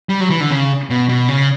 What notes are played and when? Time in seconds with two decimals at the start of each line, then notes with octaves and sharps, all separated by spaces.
0.09 G3
0.21 F#3
0.30 E3
0.41 D3
0.50 C#3
0.90 B2
1.09 B2
1.28 C#3